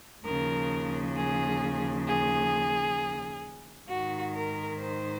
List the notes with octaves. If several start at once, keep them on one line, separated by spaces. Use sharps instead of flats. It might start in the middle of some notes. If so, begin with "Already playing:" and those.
D#2 C#3 F3 A#4
G#4
G#4
G#2 D#3 F#4
A#4
C5